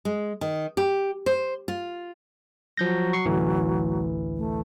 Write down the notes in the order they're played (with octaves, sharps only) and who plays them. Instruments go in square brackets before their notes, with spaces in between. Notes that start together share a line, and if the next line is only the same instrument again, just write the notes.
[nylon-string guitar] G#3
D#3
G4
C5
F4
[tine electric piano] F3 G6 A#6 [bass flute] F#3
[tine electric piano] C#6 C7 C#7
A1 D2 E3
[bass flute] A3